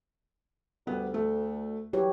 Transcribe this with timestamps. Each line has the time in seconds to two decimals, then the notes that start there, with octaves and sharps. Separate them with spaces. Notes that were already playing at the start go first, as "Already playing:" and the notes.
0.87 D2 G3 B3 G4
1.14 A3
1.93 E3 F#3 G4 C#5